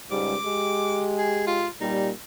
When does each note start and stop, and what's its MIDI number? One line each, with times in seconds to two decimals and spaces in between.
0.11 0.36 37
0.11 0.36 44
0.11 0.36 55
0.11 1.01 86
0.45 1.66 56
0.45 1.66 67
1.18 1.44 68
1.47 1.68 65
1.81 2.11 46
1.81 2.11 55
1.81 2.09 63